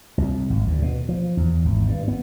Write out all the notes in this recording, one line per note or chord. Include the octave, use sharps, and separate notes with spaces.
C2
G#1
D2
B2
F3
E2
G#1
G2
B3